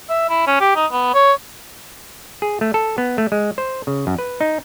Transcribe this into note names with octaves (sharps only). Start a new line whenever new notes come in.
E5
E4
C#4
G4
D#4
B3
C#5
G#4
A3
A4
B3
A3
G#3
C5
C#3
F#2
B4
D#4